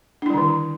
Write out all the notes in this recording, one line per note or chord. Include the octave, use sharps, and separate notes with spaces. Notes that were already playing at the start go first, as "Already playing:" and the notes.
D3 D#3 G3 D4 E4